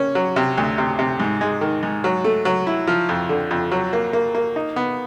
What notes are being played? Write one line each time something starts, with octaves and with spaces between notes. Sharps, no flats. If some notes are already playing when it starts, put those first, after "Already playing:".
Already playing: A#3 C#4
F#3
C3
D2
C3
C3
G#2
G#3
D#3
G#2
F#3
A3
F#3
E4
F3
F2
D3
F2
F#3
A#3
A#3
A#3
D#4
B3